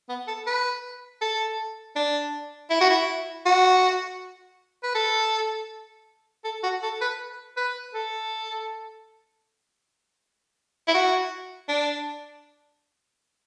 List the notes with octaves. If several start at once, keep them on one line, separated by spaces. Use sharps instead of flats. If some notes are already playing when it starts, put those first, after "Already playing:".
B3
A4
B4
A4
D4
E4
F#4
E4
F#4
B4
A4
A4
F#4
A4
B4
B4
A4
E4
F#4
D4